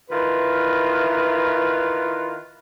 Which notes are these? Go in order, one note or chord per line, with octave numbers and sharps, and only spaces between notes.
D#3 E4 F4 B4